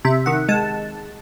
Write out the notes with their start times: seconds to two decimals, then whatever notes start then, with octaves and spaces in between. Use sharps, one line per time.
0.05 C3 E5
0.26 D#3 F#5
0.49 G#3 A5